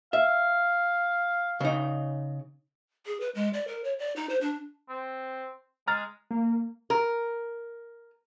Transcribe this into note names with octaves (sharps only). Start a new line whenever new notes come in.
E5 F5
C#3 D#4
G#4
B4
G#3
D5
A#4
C#5
D5
D#4
C5
D4
C4
G#3 A#5 F6 A6
A#3
A#4